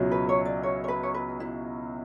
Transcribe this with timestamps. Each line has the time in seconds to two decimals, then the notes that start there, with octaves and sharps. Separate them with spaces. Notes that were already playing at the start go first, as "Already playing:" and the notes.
Already playing: C#2 B2 F#3 C#4 E4
0.11 B4
0.29 C#5
0.45 D5
0.63 C#5
0.84 C#5
0.88 B4
1.03 C#5
1.14 B4
1.40 E4